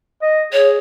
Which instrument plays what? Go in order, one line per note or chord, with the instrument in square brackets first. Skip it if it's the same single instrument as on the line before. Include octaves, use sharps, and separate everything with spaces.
[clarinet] D#5
[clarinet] G#4 [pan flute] C#5